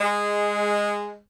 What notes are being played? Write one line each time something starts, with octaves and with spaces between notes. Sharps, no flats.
G#3